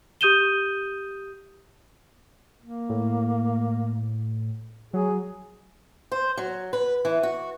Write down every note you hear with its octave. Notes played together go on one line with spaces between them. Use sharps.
G4 D#6 G6 D#7 E7 G7
A#3
A2
F#3 G#4
C5
F#3
B4
E3
F#4